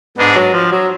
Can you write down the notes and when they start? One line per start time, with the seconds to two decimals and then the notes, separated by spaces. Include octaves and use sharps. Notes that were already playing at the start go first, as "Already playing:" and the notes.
0.17 G#2 G#3 B3 D4 G#4
0.35 F#3
0.54 F3
0.72 F#3